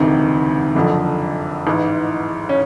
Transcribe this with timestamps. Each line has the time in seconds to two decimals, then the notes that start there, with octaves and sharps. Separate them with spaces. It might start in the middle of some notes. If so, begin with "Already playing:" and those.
Already playing: E1 D2 C3 D#3
0.75 F#1 F2 D3 F3
1.67 A1 G#2 E3
2.49 C#4